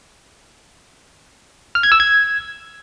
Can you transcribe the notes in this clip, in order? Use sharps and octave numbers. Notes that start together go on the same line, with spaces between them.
F6
G#6
E6
G#6